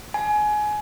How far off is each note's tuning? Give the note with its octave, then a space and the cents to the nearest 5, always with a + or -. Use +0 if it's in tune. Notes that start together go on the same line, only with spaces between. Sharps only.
G#5 +20